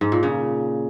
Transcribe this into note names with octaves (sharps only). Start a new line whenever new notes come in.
G#2
A#2
C#3